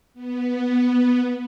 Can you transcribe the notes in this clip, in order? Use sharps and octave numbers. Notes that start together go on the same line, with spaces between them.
B3